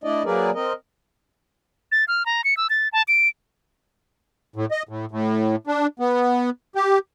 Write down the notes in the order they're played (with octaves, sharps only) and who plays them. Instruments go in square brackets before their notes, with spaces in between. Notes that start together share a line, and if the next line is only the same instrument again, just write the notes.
[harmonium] A3 D4 E4 D5 D#5
F#3 A#3 G#4 A#4 B4 D5
C4 A#4 D#5
[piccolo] A6
F6
A#5
C#7
E6
A6
A5
D7
[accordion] A2
D#5
A2
A2
D4
B3
G4